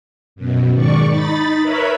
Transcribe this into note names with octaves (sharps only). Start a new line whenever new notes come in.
F#2 B2
G#2 D#3 D5 C#6
D#4 B5 A6
A#4 B4 C#5 E5 B5